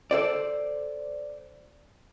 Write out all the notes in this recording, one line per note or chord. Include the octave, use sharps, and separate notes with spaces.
A4 C5 D5